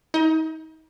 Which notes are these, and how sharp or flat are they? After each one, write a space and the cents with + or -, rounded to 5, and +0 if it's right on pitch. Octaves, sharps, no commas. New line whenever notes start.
D#4 +40